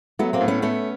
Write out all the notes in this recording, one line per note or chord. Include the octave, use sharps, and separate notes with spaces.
F#3 A3 B3
A#3 C4
A2
B3 C#4
A3 B3 C#4